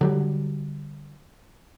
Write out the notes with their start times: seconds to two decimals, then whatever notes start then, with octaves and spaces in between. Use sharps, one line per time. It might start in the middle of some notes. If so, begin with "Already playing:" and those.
0.01 D3 F#3 G3